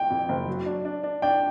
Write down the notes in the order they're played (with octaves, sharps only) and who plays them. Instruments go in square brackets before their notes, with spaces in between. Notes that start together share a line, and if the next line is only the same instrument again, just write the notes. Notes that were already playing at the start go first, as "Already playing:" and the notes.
Already playing: [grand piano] G5
[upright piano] F2
F#1
F#3
D4
D4
D4
[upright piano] D4 [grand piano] G5